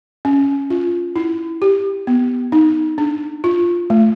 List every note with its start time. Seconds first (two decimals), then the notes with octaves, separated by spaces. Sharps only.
0.25 C#4
0.70 F4
1.16 E4
1.62 G4
2.07 B3
2.52 D#4
2.98 D4
3.44 F4
3.90 A3